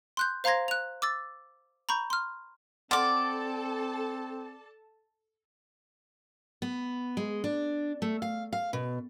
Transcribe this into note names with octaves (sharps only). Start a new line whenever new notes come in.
C6 F#6 G6
C5 F5 A#5 C6 G#6 A#6
F#6 F7
D6 E6 A6
A#5 B5 C#6 G6
C6 F6
C4 A4 D5 F#5 A5 C6 D6 F6
B3
G#3
D4
A3
F5
F5
B2